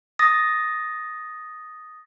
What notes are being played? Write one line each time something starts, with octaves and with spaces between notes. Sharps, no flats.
D#6 A6 A#6